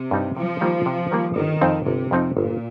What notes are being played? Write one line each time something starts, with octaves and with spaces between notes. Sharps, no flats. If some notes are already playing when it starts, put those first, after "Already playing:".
Already playing: C3
G2 G3 D#4
C3 F3
D#3 G3 A#3
C3
D#3 G3 A#3
G1 D#3
F2 F3 C4 D#4
G1 C3
F2 F3 C4 D#4
G1 A#2